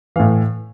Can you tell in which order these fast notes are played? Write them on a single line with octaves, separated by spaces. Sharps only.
E3 F5 A2